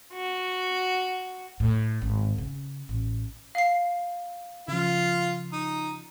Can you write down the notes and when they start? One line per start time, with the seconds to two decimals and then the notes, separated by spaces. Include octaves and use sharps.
0.13 F#4
1.60 A2
2.02 G#1
2.38 C#3
2.89 A1
3.55 F5 C7
4.68 C#3 F3 F4
5.53 D#4